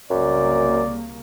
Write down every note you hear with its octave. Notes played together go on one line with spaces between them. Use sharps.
C2 F#2 C#3 A#3 D5